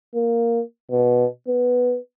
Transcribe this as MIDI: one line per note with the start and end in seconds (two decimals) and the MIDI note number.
0.15 0.62 58
0.91 1.25 47
1.48 1.98 59